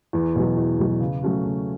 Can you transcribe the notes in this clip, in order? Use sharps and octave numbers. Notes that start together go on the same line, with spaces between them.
E2
B2 F#3
E2
B2 F#3
C#3
F#3 A3 C#4 F#4
C#3